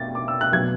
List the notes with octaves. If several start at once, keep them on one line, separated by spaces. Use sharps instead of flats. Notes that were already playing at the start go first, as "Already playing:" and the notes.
Already playing: B2 A6
D6
E6
F#6
B2 F#3 G#6